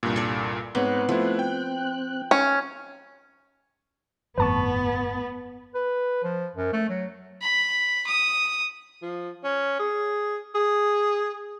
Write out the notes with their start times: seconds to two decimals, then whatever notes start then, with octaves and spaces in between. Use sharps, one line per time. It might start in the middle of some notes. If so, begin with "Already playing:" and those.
0.03 C2 G2 A#2
0.16 A4 D5
0.75 G#2 B3 C4 C#5 F#6
1.09 F3 A3 E4
1.39 G5
2.31 C#4
4.38 G1 F2 A2 B3 B4 A5 C#6
5.75 B4
6.24 F3
6.56 F#2
6.73 A3
6.89 F#3
7.42 B5
8.07 D#6
9.02 F3
9.44 C#4
9.79 G#4
10.55 G#4